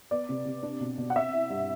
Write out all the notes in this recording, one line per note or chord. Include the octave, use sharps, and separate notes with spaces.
B3 D5
C3
C3
D4
B2
B2
F#5
C4 E5
E4
G2